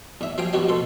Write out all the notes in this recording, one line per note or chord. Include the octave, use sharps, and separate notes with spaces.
E2 E5
F3 G#4 F5 G5 D#6
F3 B3 F#4 G4 D#5
B2 A4 C6